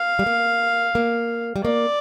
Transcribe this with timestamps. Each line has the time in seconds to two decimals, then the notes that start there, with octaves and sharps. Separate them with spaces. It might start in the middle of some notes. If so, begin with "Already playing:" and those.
Already playing: F5
0.19 G3
0.26 A#3
0.95 A#3
1.56 G3
1.64 A#3 D5